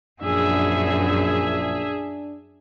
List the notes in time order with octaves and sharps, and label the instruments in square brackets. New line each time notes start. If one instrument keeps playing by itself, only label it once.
[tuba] A#1 [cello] F#2 [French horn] D4 [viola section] G#4 E5